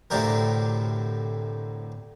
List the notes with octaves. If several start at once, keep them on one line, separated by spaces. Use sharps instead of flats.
D2 A2 C3 D4 G4 A#4